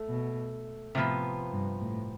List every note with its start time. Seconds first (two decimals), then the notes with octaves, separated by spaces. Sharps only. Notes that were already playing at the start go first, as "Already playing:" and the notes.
Already playing: A3
0.10 B2
0.95 A2 C3 F3 B3
1.53 G2
1.81 A2